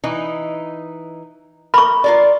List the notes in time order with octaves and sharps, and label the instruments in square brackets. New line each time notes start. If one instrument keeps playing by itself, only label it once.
[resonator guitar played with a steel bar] E3 D#4
[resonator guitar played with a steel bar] A#4 [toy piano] B5 C#6
[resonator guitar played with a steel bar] F4 A#4 D5